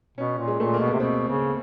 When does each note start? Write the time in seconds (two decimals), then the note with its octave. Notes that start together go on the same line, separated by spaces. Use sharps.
0.18 B2 C#4
0.38 A#2
0.48 G#3
0.59 A#2 A3
0.74 A#3
0.79 B2
0.87 B3
0.93 C3
1.00 B2 C4
1.28 C#3